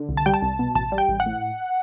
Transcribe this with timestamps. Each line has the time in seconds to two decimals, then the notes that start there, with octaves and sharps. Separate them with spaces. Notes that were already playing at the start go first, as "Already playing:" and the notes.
Already playing: D3
0.09 C2
0.17 A5
0.26 G3 G5
0.34 A5
0.42 C2
0.59 B2
0.75 A1 A5
0.92 G3
0.98 G5
1.09 A1
1.20 F#5
1.26 A2